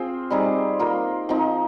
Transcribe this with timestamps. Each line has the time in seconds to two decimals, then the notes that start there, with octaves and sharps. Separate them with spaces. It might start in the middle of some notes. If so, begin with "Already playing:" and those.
Already playing: C4 F4 G#4 C5
0.30 G3 C4 D#4 G#4
0.79 A#3 F4 A#4
1.29 F3 C4 D#4